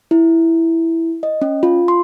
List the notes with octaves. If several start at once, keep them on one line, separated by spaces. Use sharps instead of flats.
E4
D#5
C#4
F4
C6